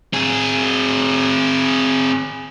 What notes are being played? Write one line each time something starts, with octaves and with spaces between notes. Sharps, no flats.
C4 G#4